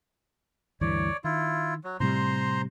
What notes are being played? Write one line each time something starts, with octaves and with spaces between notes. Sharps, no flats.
D2 G2 E3 C#5 D5
D#3 E4 F4
F#3
A2 C3 G3 C5 A#5 C6